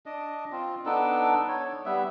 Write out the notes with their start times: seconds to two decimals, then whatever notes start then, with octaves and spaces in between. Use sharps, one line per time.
0.06 D4 D#5
0.52 C4 F4
0.86 B3 D4 D#4 A4
1.48 C#5
1.86 G3 B3 E5